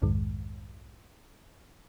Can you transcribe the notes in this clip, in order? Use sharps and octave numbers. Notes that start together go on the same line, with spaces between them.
B1 F2 G#2 D#3 G#3